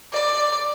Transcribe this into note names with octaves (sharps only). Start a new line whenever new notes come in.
D5